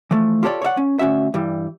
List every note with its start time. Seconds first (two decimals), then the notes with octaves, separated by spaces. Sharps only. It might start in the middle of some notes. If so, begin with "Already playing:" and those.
0.11 E3 F3 A3
0.43 F4 G4 A4 A#4 C#5 D5
0.62 C#5 D5 E5 F#5
0.77 C#4
0.99 D2 C#4 F#4 E5
1.34 G2 E3 G3